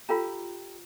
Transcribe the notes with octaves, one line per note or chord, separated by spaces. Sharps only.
F4 G4 A4 F5 A#5 B5